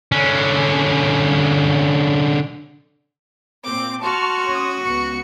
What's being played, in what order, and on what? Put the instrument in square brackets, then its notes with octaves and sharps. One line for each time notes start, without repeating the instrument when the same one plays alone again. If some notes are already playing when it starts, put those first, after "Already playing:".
[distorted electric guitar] D3 C#4
[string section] A#2 C4 [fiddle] D6
[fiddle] F#4 [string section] A5 C#6 F6 [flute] C6
[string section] C#4 D#6
[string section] C#2 B3 C#7 [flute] C#6